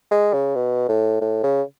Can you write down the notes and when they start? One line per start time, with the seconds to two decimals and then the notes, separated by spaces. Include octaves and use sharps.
0.11 G#3
0.33 C#3
0.55 B2
0.89 A2
1.21 A2
1.43 C#3